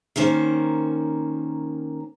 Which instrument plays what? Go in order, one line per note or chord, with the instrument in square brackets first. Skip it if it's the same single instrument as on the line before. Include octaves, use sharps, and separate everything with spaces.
[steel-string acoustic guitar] D#3 A#3 C#4 C5